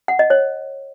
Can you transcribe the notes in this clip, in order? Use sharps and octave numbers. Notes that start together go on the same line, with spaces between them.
F#5
D#5
C#5